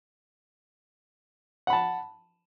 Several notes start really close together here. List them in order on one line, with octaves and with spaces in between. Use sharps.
F#5 B5 A5